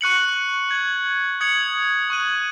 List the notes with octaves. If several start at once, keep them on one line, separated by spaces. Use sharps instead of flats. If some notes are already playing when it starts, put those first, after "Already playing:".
C#6 F#6 C#7 F#7
G#6 F#7
D#6 G#6 C#7 F#7
C#6 F#6 D#7 F#7